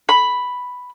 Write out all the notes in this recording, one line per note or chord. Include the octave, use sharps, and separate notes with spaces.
B5